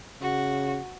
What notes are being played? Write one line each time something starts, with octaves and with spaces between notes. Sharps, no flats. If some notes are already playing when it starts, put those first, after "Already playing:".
C#3 F#4